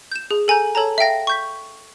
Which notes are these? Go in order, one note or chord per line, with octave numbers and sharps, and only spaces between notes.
G6 E7
G#4
A4 G#5 A#5 G6
A4 C#5 A5 A#5
E5 F5 G5 A#6
C#6 G6 B6